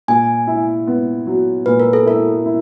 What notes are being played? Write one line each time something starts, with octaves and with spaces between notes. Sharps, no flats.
A#2 G#5
E4
B3
F#3
A#2 B4
A#4
A4
E4 A#4
E4